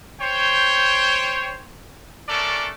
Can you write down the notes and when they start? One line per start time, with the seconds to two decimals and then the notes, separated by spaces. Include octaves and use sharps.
0.20 C5 C#5 G5
2.28 A3 C#4 D4 A4 A#4 D5